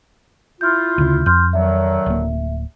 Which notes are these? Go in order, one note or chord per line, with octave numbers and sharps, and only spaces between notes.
E4 F4 F6 G6
D2 C#3
F2 C6 F6 G6
D3 D#3 F#3 E5
D1 A#3